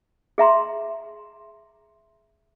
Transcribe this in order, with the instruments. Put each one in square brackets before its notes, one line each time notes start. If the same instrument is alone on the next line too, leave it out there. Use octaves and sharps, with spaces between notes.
[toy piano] G#4 E5 A#5 C6